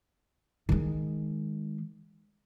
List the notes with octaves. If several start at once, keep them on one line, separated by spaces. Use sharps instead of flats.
D#3 G#3